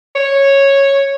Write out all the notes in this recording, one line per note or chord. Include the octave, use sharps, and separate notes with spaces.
C#5